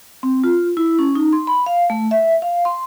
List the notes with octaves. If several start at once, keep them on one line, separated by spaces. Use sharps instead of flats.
C4
F4
E4
C#4
D#4
C6
B5
F5
A3
E5
F5
C6